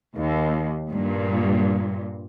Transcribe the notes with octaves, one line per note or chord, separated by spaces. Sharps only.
D#2
G2 A#2